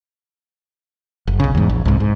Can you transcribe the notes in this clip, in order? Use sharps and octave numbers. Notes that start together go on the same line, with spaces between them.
F#1
B1 C#3
E2 G#2
A#1
C2 G#2
G#2